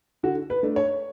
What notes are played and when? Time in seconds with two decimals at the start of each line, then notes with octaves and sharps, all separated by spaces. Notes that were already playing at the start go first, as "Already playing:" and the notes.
0.23 D3 F#4
0.50 B4
0.63 A3 D4
0.76 C#5